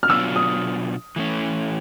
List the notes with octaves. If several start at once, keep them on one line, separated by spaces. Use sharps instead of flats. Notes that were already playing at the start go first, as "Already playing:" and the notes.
F6
B2 F#3 B3 D4 F4 E6
D#6
E3 A3 C#4